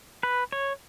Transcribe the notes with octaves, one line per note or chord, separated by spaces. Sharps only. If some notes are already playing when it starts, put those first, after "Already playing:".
B4
C#5